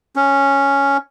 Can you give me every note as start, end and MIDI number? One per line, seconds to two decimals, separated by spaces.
0.16 0.97 61